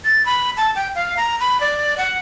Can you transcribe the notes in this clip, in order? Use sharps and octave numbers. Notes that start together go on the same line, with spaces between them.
A6
B5
A5
G5
F5
A#5
B5
D5
F#5